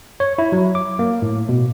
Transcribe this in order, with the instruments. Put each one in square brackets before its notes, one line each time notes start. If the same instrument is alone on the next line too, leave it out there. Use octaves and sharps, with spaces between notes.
[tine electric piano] C#5
E4
F#3
D6
A#3
A2
B2